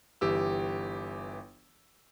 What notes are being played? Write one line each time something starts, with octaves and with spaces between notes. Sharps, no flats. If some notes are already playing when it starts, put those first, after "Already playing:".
G1 E3 G4 G5 E6